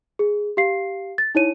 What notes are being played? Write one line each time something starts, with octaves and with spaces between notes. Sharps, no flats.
G#4
G4 F5 C7
A6
D#4 E4 C#5 D#7